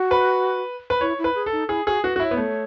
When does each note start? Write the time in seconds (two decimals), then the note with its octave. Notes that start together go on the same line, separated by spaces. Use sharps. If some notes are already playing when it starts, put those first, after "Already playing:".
Already playing: F#4
0.11 B4
0.90 B4
1.01 E4 C#5
1.19 E4
1.24 B4
1.35 G#4
1.46 A4
1.52 D#4
1.69 E4 G#4
1.87 F#4 G#4
2.03 F#4 B4
2.16 F#4
2.20 E4 C#5
2.31 B3
2.37 A3